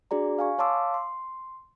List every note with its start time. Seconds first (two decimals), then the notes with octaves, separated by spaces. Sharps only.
0.11 D4 F#4 G#4 D5 A#5
0.39 F5 G#5 C#6
0.58 C#5 F5 A5 C6 D6 E6
0.94 C6